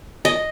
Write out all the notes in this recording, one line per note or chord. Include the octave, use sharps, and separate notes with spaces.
D#5